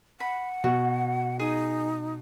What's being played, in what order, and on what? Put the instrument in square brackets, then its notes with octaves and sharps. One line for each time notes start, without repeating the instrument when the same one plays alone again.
[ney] F#5 [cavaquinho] B5
[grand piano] B2 [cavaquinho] F#4
[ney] D#4 [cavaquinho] G#4 D#6